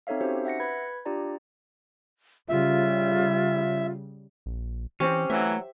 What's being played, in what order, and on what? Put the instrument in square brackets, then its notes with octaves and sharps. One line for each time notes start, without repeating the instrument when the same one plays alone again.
[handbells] C4 D#4 A4 C#5 E5 F5
C#4 D#4 F#4 G4 C5
E5 F#5 A#6 C#7
B4 B5 G#6
D4 F4 G4 D5 A#5
[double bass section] C#3 G3 [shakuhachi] F4 [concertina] E5
[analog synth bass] A#1
[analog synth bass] E3 [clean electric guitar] C4 C#4 [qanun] G4 C5
[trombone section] E3 F#3 [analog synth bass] A3 [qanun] E5